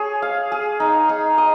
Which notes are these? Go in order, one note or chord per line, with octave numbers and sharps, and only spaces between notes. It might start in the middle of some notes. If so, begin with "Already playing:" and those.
Already playing: G#4 C#5
F5
G#4
D#4
D#4
D#5